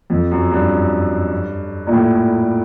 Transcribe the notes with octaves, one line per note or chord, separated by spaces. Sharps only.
F2
F#2
G2
A#2
A2